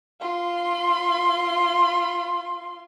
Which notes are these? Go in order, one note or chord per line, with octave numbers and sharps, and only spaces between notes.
F4 C6